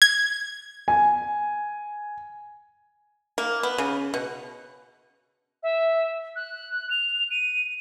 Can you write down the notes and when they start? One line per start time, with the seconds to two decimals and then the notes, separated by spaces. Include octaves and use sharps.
0.02 G#6
0.88 G#5
3.38 A#3
3.63 B3
3.78 C#3
4.14 B2
5.63 E5
6.36 F#6
6.90 F7
7.31 D#7